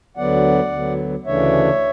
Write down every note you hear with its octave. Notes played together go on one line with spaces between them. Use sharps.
D2 D3 F#3 B3 D5 F#5
D2 D3 F#3 B3
D2 C#3 E3 A3 D4 C#5 E5